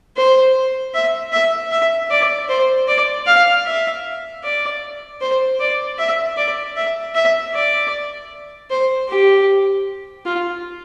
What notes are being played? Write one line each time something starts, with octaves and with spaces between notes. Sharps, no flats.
C5
E5
E5
E5
D5
C5
D5
F5
E5
D5
C5
D5
E5
D5
E5
E5
D5
C5
G4
F4